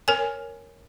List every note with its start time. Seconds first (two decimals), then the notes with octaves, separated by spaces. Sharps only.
0.08 A#4 C#5 G#5